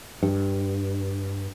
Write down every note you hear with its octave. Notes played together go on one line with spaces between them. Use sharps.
G2